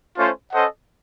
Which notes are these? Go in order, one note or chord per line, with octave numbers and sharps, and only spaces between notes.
A3 C#4 F4 C5
C#4 A4 C5 D#5 F#5